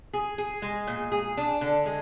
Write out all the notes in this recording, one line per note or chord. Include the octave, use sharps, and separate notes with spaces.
G#4
G#4
G#3
A#2
G#4
D4
D3
G#3